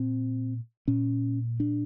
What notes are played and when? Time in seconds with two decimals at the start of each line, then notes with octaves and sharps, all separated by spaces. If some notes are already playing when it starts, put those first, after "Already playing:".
Already playing: A#2 C4
0.88 A#2 C#4
1.60 D4